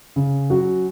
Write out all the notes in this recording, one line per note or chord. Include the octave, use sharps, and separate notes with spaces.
C#3
F#3 C#4 F#4